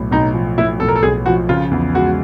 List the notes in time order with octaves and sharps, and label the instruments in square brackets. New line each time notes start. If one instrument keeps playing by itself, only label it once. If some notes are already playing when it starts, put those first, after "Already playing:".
Already playing: [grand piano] B1 A2
[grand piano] B1 [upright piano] D#4
[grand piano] F3
[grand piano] A2 [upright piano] E4
[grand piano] B1 [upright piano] A4
[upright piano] A#4
A4
[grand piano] B1 [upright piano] G#4
[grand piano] F3 [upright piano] F#4
[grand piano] C#3 [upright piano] F4
[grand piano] E2
[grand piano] G#3 [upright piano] F#4